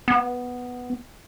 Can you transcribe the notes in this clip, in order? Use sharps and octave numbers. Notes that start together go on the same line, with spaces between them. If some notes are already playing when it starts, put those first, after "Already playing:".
B3